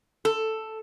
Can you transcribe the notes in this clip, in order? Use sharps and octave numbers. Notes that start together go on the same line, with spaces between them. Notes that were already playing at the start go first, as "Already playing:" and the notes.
A4